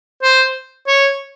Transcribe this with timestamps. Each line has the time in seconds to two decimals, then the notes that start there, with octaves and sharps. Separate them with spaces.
0.23 C5
0.87 C#5